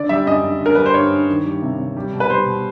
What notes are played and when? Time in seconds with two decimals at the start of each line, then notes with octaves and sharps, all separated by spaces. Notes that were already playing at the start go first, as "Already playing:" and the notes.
Already playing: D3 D5
0.09 G3 E5
0.26 F#2 D#5
0.44 F#2
0.60 D3
0.66 A#4
0.75 G3 B4
0.86 C5
0.94 G2 C#5
1.11 G2
1.29 D#3
1.45 G3
1.62 C3
1.79 C3
1.97 G3
2.13 B2
2.20 B4
2.30 G3 C5
2.46 B2